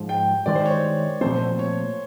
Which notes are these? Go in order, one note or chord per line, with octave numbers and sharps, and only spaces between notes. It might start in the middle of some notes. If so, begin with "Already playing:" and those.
Already playing: G#2 F3 G#3
G5
G2 D#3 G#3 D5
C5
C#5
A#2 F3 A3 C4 C5
C#5